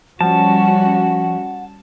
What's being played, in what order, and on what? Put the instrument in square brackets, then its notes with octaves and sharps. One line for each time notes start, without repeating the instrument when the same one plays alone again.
[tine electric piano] F3 [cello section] G3 C#4 F#4 [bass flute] F#5 [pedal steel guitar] A5